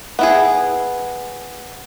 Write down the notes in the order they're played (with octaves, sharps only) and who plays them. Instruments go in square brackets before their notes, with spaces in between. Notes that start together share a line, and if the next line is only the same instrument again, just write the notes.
[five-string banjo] B3 E4 G#4